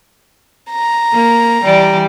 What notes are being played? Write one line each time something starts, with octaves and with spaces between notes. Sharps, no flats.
A#5
A#3
E3 G3 D5